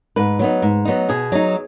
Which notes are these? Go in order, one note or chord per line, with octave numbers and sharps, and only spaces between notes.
G#2 B4
F#3 B3 D#4
G#2
F#3 B3 D#4
B2 G#4
F#3 D#4